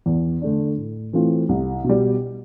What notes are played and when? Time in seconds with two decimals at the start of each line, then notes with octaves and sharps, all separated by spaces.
0.06 E2
0.42 D3 A3 D4
0.78 A2
1.13 E3 A3 C4 F4
1.49 C2
1.84 B2
1.89 G3